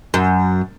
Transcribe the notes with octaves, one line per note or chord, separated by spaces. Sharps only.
F#2